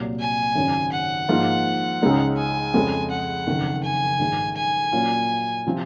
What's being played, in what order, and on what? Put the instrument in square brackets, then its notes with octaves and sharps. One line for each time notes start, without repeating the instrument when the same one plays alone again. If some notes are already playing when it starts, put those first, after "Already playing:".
Already playing: [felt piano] C2 A#2 F#3
[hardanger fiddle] G#5
[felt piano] G#1 F#2 C#3
[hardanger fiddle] F#5
[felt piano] G#2 F3 A#3 F4
C#2 C#3 G#3 D#4
[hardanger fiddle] G#5
[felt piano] F2 C#3 G#3
[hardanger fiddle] F#5
[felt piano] F#1 F2 D#3
[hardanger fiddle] G#5
[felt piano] A#1 G#2 D#3
[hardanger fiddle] G#5
[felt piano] A#2 F#3 A#3 C#4 F4
C3 F3 C4